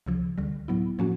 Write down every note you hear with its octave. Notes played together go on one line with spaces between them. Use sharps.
C#2 C#3 F3
D2 D3 G3
A2 F#3 B3 E4
A2 F3 A#3 C#4 F#4